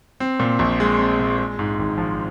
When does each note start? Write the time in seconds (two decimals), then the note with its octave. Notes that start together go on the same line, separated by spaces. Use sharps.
0.20 C4
0.39 A#2
0.59 A#1
0.80 G#3
0.99 C4
1.19 A#2
1.38 G#3
1.59 G#2
1.79 G#1
1.98 F3